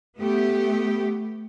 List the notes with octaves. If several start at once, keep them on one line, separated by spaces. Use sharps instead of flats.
A3 B3 G4